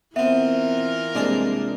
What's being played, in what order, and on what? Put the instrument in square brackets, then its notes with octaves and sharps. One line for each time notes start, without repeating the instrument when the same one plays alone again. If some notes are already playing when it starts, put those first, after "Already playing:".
[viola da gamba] E3 F4 A#4 [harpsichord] B3 C4 [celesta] E5
[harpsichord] C2 G#4 A5 [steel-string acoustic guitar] G#3 A#3 D4